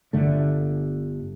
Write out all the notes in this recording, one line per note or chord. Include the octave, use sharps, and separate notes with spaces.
G1 D3 A3